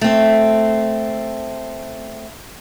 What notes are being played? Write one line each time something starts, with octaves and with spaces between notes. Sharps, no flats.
A3 C4